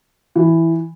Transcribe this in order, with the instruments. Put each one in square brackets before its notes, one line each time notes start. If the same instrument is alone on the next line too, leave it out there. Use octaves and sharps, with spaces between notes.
[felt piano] E3